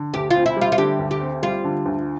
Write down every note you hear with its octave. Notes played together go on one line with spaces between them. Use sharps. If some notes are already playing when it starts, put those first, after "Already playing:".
Already playing: D3
D2 G4
F4
C4
E4
G3
F4
F4
D3 G4
D2
G4
C4
G3 F4
D3
D2